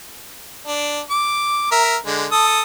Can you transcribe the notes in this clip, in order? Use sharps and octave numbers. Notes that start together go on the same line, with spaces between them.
D4
D6
A#4 E5
D3 G#3
A4 D#6